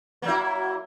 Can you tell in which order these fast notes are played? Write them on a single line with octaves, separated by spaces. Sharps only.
A#3 F#3 E4